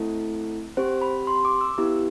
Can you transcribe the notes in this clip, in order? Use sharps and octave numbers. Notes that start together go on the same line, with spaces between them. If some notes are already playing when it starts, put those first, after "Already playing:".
Already playing: A3 C4 E4 A4
C4 G4 C5
B5
C6
D6
E6
B3 E4 G4